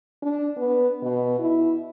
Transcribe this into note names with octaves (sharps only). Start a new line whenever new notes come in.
D4
B3
B2
E4